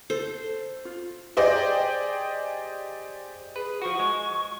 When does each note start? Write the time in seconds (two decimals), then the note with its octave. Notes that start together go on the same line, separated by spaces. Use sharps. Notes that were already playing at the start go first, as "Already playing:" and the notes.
0.10 A4 C5
0.85 F4
1.37 G4 G#4 C5 D5 D#5 G5
3.56 G#4 B4
3.82 F3 F#4 C#6
3.99 G#3